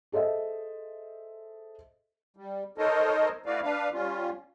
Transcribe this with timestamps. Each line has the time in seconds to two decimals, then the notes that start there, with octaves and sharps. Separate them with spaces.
0.12 G#4 A4 C5 D#5 E5
2.37 G3
2.78 D#4 A4 A#4 C5 C#5 D#5
3.46 A3 E4 F#4 B4 D5 F5
3.63 D4 B4 F5
3.93 G3 C#4 F4